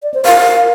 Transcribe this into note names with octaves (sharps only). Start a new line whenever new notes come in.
D5
C5
A#4 F5